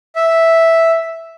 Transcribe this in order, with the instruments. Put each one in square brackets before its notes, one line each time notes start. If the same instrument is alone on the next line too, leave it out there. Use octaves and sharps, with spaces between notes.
[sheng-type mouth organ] E5